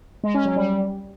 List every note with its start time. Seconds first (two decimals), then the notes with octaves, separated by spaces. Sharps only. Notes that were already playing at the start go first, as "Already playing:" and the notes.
0.24 G#3
0.34 C#4
0.45 F#3
0.56 G3